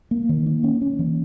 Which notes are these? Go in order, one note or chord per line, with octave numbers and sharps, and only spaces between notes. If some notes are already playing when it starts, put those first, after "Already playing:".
A#3
D#3
A#3
C#4
C#4
E3